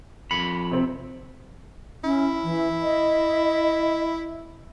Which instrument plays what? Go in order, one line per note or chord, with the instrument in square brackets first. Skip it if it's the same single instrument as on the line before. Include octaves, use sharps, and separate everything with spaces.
[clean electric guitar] F2 B5 [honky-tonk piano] C#7
[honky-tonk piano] C3 C4
[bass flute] C#4 [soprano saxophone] E4
[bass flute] E3
D#5